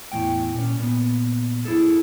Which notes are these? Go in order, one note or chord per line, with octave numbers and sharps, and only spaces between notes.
E2 A2 G5
A#2 C#4
A#2 B3
F#2 E4 G#4 A4